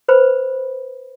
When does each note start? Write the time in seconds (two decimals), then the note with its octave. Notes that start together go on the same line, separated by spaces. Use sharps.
0.08 B4 C5 B5